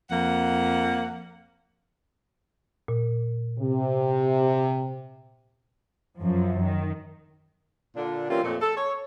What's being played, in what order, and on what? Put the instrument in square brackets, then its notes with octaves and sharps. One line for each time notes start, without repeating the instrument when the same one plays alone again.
[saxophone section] F2 A#3 F#5
[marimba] A#2
[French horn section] C3
[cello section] F#2 F3
D#3
[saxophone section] A#2 D3 D4
E3 G3 A#3 C4 C#4 F4
F2 A#2 A3
A4
C#5